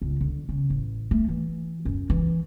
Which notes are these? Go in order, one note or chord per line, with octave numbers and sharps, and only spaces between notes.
C#2
D3
C#3
A1
A3
E3
F#2
E3